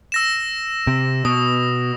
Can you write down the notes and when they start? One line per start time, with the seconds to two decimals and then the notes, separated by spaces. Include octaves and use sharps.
0.12 E6 A#6 E7
0.87 C3
1.25 B2 D#6